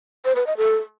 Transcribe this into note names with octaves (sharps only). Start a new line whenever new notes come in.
C5
B4
D#5
A4